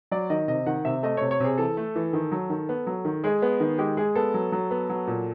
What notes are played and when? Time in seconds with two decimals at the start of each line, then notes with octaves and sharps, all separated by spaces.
0.11 F#3 D5
0.30 D#3 D#5
0.48 C3 D#5
0.66 D#3 F#5
0.85 C3 E5
1.03 A3 D#5
1.17 C3 C#5
1.31 C#5
1.40 C3 G#4
1.58 E3 A4
1.77 A3
1.96 E3
2.13 D#3
2.32 F#3
2.50 D#3
2.69 B3
2.87 F#3
3.05 D#3
3.24 G#3 G#4
3.42 B3
3.60 D#3
3.78 G#3 G4
3.97 G#3 G#4
4.15 B3 A4
4.34 F#3
4.52 F#3
4.71 B3
4.90 F#3
5.07 A#2